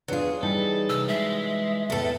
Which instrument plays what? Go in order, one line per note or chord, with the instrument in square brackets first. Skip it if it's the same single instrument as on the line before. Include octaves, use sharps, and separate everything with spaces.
[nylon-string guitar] E2 D4 F4 [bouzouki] F#3 G#4
[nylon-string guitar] E3 G3 D#4 [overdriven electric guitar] A4
[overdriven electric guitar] C2 [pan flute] E6
[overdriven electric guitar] G#3 [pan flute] E5
[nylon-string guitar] E2 A2 [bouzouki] A3 A4